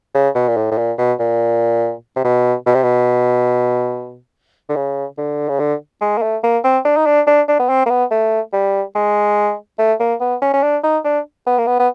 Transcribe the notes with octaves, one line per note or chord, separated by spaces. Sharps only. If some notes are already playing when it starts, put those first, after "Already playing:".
C#3
B2
A#2
A2
A2
A#2
B2
A#2
C3
B2
B2
C3
B2
D3
C#3
D3
C#3
D3
G#3
A#3
A3
A#3
C4
D4
D#4
D4
D4
D4
B3
C4
A#3
B3
A3
G3
G#3
A3
A#3
B3
C#4
C#4
D4
D#4
D4
B3
A#3
B3
B3